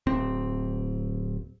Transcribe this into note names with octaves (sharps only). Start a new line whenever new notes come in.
D1 C4